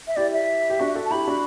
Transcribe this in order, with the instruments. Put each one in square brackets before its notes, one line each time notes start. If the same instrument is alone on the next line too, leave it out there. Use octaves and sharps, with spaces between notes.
[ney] E5
[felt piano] E4 G4 [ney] D5
[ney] E5
[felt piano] G4
D4 F#4
F#4 A4
[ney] A5
[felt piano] E4 G4 [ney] B5
[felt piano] D4 F#4